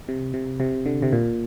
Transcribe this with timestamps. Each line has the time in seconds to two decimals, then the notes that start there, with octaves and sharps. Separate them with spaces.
0.09 C3
0.34 C3
0.60 C3
0.86 D3
1.02 C3
1.12 A#2